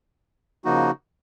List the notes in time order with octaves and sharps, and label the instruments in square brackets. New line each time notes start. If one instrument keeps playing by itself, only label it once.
[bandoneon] C#3 F3 A#3 D#4 F#4